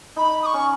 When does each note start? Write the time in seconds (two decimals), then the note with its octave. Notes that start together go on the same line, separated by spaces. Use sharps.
0.16 D#4 B5
0.42 D#6
0.46 C#6
0.54 C#4